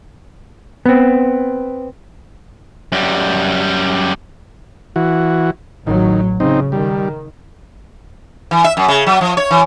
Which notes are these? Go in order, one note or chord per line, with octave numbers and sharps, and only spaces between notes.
B3 C4
F#2 G3
E3 F#4
A1 D#3 F#3
C#3 C4 D#4
D#3 G3
E3
E5
F#2
C#3
F#3
F3
C#5
E3